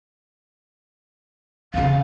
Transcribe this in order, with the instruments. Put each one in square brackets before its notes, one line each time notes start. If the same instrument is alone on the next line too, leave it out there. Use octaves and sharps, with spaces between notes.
[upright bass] E2 C#3 [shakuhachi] F5